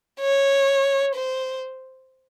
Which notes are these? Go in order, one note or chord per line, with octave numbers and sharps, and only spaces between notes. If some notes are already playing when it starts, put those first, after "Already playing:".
C#5
C5